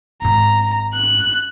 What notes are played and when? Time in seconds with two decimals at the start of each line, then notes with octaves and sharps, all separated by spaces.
0.22 G#1 G#2 A#5
0.94 F#6